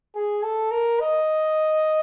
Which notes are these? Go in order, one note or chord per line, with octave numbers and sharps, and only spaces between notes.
G#4
A4
A#4
D#5